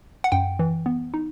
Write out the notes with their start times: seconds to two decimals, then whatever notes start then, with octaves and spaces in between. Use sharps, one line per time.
0.24 F#5
0.32 F#2 G5
0.59 E3
0.86 B3
1.14 D#4